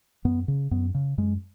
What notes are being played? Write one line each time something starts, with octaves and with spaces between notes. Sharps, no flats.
F#2 B3
C#3
F#2 B3
C#3
F#2 G#3